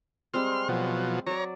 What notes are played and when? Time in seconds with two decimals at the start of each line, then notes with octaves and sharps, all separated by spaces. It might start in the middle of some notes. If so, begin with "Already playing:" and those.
0.34 G3 G#3 C4 C6 F6
0.69 B2 F3 F#3 C6
1.26 F#3 C#5 D5 A#5